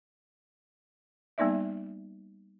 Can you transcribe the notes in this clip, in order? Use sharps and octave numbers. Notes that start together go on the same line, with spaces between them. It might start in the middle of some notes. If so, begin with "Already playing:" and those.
G3 A#3 B3 D#4 D5 E5